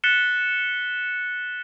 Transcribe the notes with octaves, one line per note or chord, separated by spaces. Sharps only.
F#6 A6 B6 C#7 E7 G7